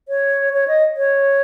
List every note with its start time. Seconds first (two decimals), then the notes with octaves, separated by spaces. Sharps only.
0.08 C#5
0.53 C#5
0.68 D#5
0.97 C#5